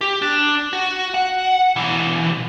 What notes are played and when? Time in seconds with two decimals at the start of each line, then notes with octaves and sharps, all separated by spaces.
0.01 G4
0.22 D4
0.73 F#4
1.14 F#5
1.76 B1 E3